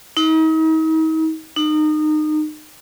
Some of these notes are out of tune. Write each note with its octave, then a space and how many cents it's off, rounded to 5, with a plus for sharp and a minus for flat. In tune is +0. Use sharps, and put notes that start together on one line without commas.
D#4 +40
D#4 -25